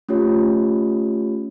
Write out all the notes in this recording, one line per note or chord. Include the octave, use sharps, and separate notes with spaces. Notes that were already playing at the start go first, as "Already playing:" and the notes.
A3 C#4 F4 G4 C#5